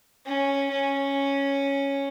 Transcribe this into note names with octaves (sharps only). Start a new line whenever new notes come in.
C#4
C#4